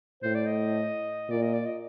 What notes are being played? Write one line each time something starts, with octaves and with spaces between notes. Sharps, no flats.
A2 C5
D5
D#5
A#2 D5
D#5
D5
D#5